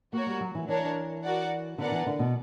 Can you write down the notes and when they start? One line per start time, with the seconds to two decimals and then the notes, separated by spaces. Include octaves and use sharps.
0.13 A#3 F#4 A#4 C#5
0.27 G3
0.41 F#3
0.55 E3
0.68 E3 D4 A#4 C#5
1.24 F#4 A#4 D5 F#5
1.78 D3 B3 D4 A#4 D5 F#5
1.92 E3
2.07 D3
2.19 B2